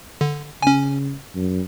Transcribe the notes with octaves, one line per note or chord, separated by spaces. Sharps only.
D3
C#3 C#4 G#5
F#2